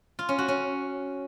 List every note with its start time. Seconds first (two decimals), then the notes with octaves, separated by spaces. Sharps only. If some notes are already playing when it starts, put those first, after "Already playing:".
0.19 F4
0.29 C#4
0.38 F#4
0.48 C#4